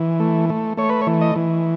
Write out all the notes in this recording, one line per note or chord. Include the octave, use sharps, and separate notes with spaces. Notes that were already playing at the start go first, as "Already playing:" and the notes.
Already playing: E3
A3
A3
A3 C#5
B4
C#5
E3
D#5
E3